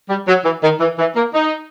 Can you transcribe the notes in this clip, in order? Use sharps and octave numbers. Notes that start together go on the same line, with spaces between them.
G3
F#3
E3
D#3
E3
E3
A#3
D#4